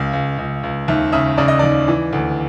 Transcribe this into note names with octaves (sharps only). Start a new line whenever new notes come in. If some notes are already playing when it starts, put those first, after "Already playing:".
Already playing: C#2 F5
C#2
C#2
C#2
D#2 E5
C#3 E5
C#3 D5
D#5
D#2 D5
E3
D2